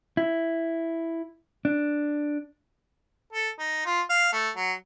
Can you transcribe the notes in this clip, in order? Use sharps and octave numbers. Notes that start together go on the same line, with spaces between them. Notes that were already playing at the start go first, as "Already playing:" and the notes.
E4
D4
A4
D#4
F4
F5
A3
F#3